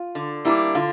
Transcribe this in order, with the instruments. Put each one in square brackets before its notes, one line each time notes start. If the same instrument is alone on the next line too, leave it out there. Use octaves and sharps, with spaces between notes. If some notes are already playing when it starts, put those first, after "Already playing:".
Already playing: [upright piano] F4
[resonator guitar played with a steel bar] D3
[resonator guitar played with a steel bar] G3 A#3 D4 [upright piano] E4
[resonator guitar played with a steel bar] D3 [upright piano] F4